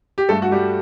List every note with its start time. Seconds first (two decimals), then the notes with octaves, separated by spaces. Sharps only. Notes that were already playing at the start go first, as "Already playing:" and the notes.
0.18 G4
0.29 G2 A3 A4
0.42 F#4
0.51 G3 G4